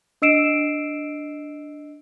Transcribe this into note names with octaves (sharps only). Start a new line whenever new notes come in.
D4 D#5 E6 C7 D7 E7